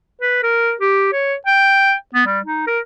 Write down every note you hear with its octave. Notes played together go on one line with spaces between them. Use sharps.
B4
A#4
G4
C#5
G5
B3
G3
D#4
A#4